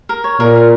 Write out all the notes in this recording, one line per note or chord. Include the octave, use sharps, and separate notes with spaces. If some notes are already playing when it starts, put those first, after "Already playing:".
A#4
C#5
A#2 A#4
F5